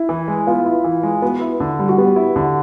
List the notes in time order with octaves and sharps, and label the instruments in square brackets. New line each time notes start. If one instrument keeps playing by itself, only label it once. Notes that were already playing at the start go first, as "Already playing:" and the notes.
Already playing: [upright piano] E4
[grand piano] E3
G#3
[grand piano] B3 [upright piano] F4
[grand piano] E4
E3
G#3
[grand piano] B3 [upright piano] F#4
[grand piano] E4
D3
G3
[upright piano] F#4
[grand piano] B3 [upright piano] G4
[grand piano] E4
D3